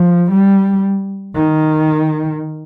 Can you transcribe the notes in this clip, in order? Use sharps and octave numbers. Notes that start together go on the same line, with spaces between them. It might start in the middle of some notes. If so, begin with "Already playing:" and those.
Already playing: F3
G3
D#3